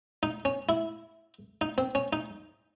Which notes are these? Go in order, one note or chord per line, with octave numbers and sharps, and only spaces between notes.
D#4
C#4
E4
D#4
C4
C#4
D#4